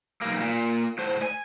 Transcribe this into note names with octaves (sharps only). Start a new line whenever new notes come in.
B1 A#3
A#2
A2 C5
G#5